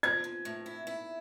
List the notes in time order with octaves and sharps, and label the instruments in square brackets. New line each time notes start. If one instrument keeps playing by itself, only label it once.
[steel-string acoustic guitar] F3 [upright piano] G#6
[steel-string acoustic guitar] F3
A2
E4
E4